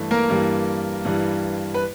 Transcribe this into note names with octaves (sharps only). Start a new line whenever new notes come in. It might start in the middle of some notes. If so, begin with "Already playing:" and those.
Already playing: G2 E3 A3
A#3 A#4
G2 E3 G3
G2 E3 G3
B4